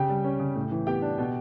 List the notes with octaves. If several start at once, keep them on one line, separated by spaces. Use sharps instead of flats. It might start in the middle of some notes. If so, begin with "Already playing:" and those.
Already playing: C#3 G4 G5
G3
C#4
C#3
A2
E3
B3 G4 G5
D4
B2